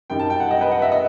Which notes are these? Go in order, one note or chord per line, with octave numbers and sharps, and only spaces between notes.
F#2 D#3 G3 G5
A5
G5
F#5
D#5
B4
F#5
E5
D#5